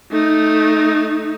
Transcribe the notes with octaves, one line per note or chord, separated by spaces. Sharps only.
A3 D#4